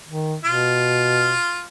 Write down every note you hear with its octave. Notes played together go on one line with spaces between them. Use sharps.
D#3
B2 F4